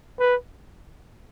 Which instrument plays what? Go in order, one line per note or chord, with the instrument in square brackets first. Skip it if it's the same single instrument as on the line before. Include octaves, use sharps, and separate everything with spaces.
[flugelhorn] B4